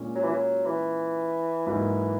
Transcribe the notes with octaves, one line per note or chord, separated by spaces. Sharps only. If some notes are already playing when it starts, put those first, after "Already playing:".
Already playing: A#2 G#3 C#4
F#3
E3
F#3
E3
G#2 E3 F#3 A#3 D#4